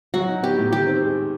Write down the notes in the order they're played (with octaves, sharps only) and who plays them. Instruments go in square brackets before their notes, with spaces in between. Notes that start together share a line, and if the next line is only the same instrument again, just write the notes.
[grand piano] F#3 [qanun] F#4
[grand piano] D#4
[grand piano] B3 [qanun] G4
[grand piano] A2
[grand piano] D#3 [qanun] G4
[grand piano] C4
G#3